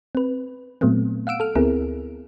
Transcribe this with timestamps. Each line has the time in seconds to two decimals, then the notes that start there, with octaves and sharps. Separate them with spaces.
0.15 C4 B4
0.81 A#2 F#3 A3 B3 C4
1.27 F5 F#5 E6 D7
1.40 A4 F6
1.55 D2 B3 C4 E4 G#4 A#4